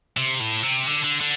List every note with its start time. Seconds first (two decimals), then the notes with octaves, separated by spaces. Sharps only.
0.17 C3
0.40 A2
0.63 C3
0.87 D3
1.04 D3
1.21 D3